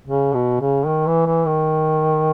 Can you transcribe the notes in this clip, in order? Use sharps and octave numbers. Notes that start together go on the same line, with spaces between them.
C#3
B2
C#3
D#3
E3
E3
D#3